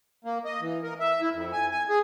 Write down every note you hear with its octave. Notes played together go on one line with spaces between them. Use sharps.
A#3
D#5
E3
A#4
E5
E4
F2
G#5
G#5
G#4